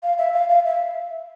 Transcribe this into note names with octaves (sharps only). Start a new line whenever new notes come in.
F5
E5
F5
F5
E5